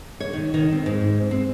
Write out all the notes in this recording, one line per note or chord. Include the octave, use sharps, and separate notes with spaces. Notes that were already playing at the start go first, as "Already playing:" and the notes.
C#5
D#3
D#3
C4
G#2
C4